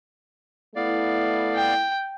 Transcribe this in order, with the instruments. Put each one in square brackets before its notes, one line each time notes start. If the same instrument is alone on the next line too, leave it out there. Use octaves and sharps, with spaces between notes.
[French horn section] A3 E4 [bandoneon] B3 D5 F5
[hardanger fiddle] G5